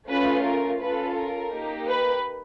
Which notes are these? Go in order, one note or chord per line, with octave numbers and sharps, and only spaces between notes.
A3 C#4 F4 B4
A#4
C#4 F4 A4 B4
A#4
A#3 D#4 G4
B4